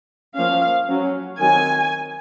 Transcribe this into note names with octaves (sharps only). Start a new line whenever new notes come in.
F3 A#3 C#4 F5
F#3 C#4
D#3 F#3 C4 G#5